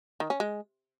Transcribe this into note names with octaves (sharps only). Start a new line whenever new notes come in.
D#3
C#4
G#3